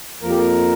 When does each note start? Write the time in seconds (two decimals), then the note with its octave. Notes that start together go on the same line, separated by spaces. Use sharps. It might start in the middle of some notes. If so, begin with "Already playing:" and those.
0.21 F2 F3 A#3 A#4
0.30 G4
0.38 A#4